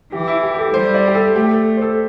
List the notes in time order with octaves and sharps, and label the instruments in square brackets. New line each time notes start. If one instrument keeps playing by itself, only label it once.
[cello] E3 [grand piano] G4
[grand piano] E4
G4
G4
A4
[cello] G3 [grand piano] C5
[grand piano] D5
G4
A4
[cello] A3 [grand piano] G4
[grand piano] A4
C5
A4